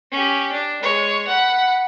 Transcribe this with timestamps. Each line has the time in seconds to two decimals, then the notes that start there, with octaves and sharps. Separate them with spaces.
0.12 C#4 G4
0.52 D4
0.83 G#3 C#5
1.28 F#5 B5